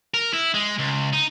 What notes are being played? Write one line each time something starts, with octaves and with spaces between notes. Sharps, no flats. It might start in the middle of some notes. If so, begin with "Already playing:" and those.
A#4
E4
G#3
C#2
D#4